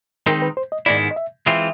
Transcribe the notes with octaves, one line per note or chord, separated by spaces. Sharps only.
D#3 G#3 C4 D#4 A#4
B4
C5
D#5
G#2 D#3 G#3 B3 E4 D5
D#5
E5
E3 G#3 C4 F4 E5